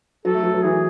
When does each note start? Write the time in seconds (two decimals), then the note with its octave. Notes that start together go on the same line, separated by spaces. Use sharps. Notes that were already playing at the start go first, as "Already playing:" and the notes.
0.25 F#3 A4
0.35 A3
0.43 F#3
0.54 F#3
0.63 E3 G#4